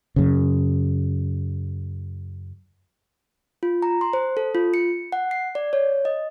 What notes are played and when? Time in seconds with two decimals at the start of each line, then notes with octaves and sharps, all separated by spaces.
0.16 F#2 C#3
3.63 F4
3.82 A#5
4.01 C6
4.13 C5
4.37 A4
4.55 F4
4.74 C#7
5.12 F#5
5.31 C7
5.55 D5
5.73 C#5
6.05 D#5